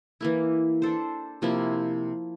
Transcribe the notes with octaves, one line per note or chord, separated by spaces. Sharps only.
E3 A#3 E4
D4 A4 C5
C3 F3 A#3 E4